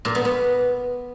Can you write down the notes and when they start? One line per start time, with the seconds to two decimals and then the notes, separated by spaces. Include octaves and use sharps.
0.05 A#2
0.15 B3
0.25 B3